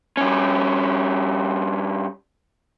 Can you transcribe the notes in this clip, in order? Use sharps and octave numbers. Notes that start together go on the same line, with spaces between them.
G2 C#4